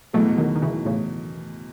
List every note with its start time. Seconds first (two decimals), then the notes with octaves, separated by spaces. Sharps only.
0.13 E2 B2 F#3 G#3 A3
0.38 D#3 F#3
0.55 D#3
0.62 C#3 E3
0.85 A2 C#3